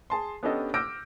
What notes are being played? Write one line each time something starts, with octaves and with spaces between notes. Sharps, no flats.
G#4 A5 C6
B3 C#4 D4 G4 A4 D#5
D6 E6 F6 G6 A#6 D7